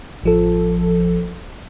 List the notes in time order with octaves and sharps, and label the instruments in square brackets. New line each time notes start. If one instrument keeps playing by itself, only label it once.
[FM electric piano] A1 F3 A4